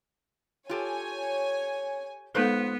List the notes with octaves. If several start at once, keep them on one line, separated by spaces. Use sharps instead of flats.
F4 G4 A4 C#5 G#5
G#3 B3 D#4 F4 A4 B4 C5